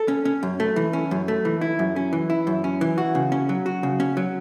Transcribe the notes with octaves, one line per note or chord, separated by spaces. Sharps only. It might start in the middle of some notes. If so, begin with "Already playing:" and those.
Already playing: A4
C#4
C#4
F#2
A3
E3
C#4
F#2
A3
E3
E4
F#2
C#4
E3
E4
F#2
C#4
E3
F#4
C#3
C#4
F#3
F#4
C#3
C#4
F#3